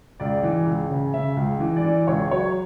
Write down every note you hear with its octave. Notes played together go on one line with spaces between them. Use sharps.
C#2 D5
E3
C#2
C#3
C#3 E5
C#2
E3
D5
E3
C#2 C#5
F#3 C#5